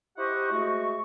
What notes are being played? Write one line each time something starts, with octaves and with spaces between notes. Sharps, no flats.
E4 G4 C5 D#5 F#5 C#6
G#3 A3 F#4 C#6